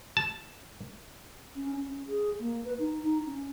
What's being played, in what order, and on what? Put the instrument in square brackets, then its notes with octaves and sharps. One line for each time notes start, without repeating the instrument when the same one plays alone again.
[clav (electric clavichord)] A5
[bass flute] C#4
C#4
G#4
A#3
B4
D#4
D#4
C#4